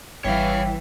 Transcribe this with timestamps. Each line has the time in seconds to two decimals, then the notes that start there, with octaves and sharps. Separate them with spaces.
0.24 G#1 E3 G3 C#5 F5 G5